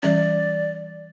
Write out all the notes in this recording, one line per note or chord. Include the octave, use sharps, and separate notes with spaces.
E3 G3 C#4 D5